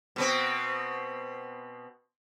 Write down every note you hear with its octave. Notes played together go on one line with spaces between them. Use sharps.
B2 B3 C4